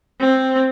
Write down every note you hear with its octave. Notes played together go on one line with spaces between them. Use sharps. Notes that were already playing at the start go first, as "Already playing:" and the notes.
C4